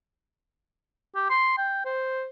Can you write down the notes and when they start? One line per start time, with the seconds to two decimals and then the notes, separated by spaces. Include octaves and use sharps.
1.15 G4
1.30 C6
1.58 G5
1.85 C5